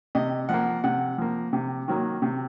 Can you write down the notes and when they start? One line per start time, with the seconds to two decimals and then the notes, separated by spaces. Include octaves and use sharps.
0.15 C3 D#5
0.49 F3 A#3 F#5
0.84 C3 F#5
1.18 F3 A#3
1.53 C3
1.88 D#3 F#3 A#3
2.22 C3